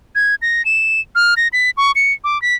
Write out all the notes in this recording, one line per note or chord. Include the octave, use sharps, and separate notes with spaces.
G#6
A#6
E7
F6
A#6
B6
C#6
C#7
D6
B6